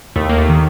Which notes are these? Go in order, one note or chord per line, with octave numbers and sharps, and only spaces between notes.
D#2 A3
A#3
A3
D#3